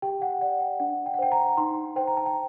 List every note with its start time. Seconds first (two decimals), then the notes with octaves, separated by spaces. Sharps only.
0.02 G4 G5
0.22 F#5
0.41 D5 F#5
0.60 G5
0.80 D4 F#5
1.06 G5
1.14 F#5
1.19 C5 G5
1.32 A#5
1.57 D#4 C6
1.96 C5 G5
2.07 A#5
2.17 A5
2.26 G5